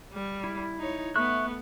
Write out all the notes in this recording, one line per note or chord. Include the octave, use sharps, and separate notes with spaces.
G3
E4
D#4 C#5
A3 B3 E5 C#6 F#6